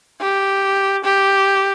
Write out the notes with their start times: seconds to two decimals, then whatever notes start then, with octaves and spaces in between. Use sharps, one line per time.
0.21 G4
1.04 G4